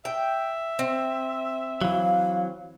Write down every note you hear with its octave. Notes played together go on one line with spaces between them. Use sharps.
E5 G5
C4
E3 F#3 F5